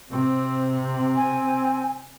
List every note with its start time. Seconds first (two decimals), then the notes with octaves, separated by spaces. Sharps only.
0.10 C3 C4
0.78 C4
1.16 G#5